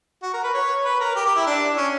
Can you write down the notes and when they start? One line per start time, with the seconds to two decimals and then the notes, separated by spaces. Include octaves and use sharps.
0.22 F#4
0.33 A#4
0.43 B4
0.53 C#5
0.84 B4
1.00 A#4
1.15 G4
1.25 G4
1.36 E4
1.47 D4
1.77 C#4